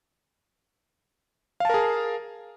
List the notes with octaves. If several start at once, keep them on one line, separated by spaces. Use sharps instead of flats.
G#4 A#4 F5 A5